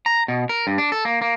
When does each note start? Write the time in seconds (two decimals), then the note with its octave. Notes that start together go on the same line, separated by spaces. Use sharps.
0.06 A#5
0.28 B2
0.49 A#4
0.67 G2
0.78 D4
0.92 A4
1.05 A#3
1.22 A#3